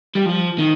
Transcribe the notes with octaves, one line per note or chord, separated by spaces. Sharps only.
G3
F3
D#3